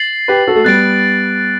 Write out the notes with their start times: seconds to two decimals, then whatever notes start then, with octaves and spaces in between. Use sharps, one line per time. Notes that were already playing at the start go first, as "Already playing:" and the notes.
Already playing: A6 C7 F#7
0.28 G4 B4
0.48 F#4 A4
0.56 A3
0.65 G3 B3 F#6 A6 D7